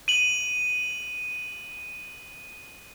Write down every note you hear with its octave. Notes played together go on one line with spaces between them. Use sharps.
D#7 F#7